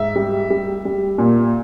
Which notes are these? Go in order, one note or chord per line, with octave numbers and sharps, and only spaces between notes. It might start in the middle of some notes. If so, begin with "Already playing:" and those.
Already playing: G#2 E5
G3
G3
G3
A#2